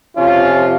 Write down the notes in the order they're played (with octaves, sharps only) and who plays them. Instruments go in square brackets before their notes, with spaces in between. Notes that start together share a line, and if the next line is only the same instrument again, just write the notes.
[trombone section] F2 C3 F3 C#4 F4